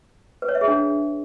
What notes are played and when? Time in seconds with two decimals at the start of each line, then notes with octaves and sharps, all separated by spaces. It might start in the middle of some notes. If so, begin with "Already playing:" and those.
0.42 B4
0.49 C#5
0.55 E5
0.61 G#4
0.68 D4